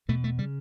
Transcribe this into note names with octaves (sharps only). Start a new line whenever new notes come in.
E2 B2 A3
A3
C#3 G3